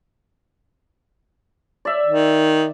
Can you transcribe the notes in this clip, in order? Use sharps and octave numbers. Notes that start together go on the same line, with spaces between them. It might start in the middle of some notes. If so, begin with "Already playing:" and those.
D5 E5
D#3